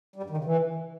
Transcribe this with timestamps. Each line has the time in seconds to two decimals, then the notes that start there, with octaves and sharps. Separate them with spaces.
0.16 G3
0.23 G2
0.30 D#3
0.37 C#3
0.44 E3